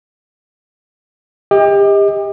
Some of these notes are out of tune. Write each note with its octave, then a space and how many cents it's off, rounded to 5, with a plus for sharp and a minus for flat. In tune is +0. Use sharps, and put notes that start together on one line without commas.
G4 +30 D#5 +30